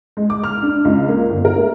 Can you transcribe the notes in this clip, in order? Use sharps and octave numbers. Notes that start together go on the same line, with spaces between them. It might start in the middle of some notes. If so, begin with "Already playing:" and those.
G#3
D6
F6
D4
C#2
A#3
G1
A#4
A3